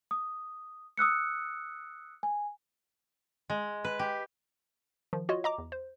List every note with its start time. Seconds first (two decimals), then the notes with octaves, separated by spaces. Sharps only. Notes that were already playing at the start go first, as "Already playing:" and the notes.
0.11 D#6
0.97 D#6 E6 F#6 C#7
2.23 G#5
3.50 G#3
3.84 B4
3.99 G4
5.13 D#3 F3
5.29 F4 F#4 C#5 D#5
5.44 D#5 A#5 D6
5.58 E2
5.72 C5